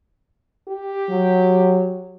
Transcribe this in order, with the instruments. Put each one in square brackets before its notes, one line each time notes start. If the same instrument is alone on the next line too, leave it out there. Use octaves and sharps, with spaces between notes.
[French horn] G4
[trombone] F#3